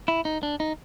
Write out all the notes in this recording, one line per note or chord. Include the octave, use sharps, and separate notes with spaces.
E4
D#4
D4
D#4